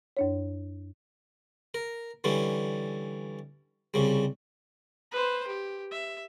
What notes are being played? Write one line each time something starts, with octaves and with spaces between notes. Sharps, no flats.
F#2 D4 C#5
A#4
D3 E3 G3 C#4
C2 C#3 G3
B4 C5
G4
E5